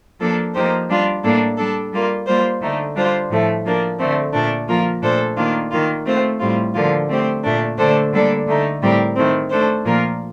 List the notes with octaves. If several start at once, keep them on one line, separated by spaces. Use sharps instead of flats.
F3 A#3 D4 A4
F3 A#3 D#4 G4 C5
G3 D4 F4
A2 G3 A#3 D4 A4
G3 D4 A4
G3 A#3 F4
G3 A#3 F4 C5
D3 A3 D#4
G3 D4 F4 C5
A2 F3 A3
F3 A#3 D4
D3 A3 C4
A#2 A3 D4
F3 A#3 F4 A#4
A#2 A3 D4 A4 C5
D#3 A#3 D4 F4
D#3 A#3 F4
A3 C4 F4 C5
A2 G3 C4 F4
D3 F3 A#3 F4
A3 C4 G4 C5
A#2 A3 D4
D3 A3 D4 A4 C5
D3 G3 A#3 D4 A4
D3 A3 D#4
A2 G3 C4 G4 A#4
D#3 A3 C4
A3 D4 A4 C5
A#2 F3 A#3 F4 A#4